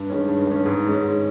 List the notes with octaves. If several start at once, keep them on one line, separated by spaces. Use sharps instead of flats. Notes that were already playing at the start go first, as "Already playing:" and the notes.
Already playing: G2
D#3 G#3 C#4
G2
D#3 G#3 C#4
G#2
D#3 G#3 C#4
G#2